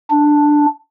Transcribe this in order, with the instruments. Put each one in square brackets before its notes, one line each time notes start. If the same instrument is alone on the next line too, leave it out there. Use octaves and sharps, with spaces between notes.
[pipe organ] D4